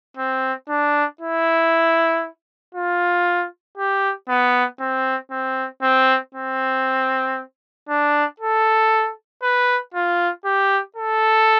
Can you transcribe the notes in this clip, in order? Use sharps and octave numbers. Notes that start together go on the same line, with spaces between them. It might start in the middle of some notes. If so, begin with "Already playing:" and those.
C4
D4
E4
F4
G4
B3
C4
C4
C4
C4
D4
A4
B4
F4
G4
A4